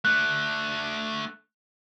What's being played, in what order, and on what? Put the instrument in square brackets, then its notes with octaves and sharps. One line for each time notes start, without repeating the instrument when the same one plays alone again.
[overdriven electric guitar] A3 D4 [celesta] F#6